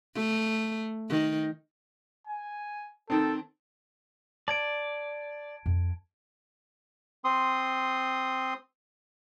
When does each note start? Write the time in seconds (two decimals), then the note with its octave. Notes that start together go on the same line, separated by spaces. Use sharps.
0.15 A3
1.09 D#3
2.27 G#5
3.10 D#3 C4 A4
4.48 D5 A5 G#6 D7
5.66 F2 C4
7.24 C4 C6 D#6